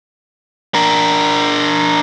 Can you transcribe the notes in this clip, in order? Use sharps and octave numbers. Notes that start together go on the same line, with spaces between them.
D4 A#4